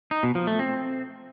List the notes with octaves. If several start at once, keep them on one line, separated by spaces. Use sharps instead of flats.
D#4
B2
F3
A3
C4